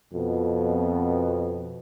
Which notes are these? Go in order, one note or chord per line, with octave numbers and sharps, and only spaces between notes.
F2 B2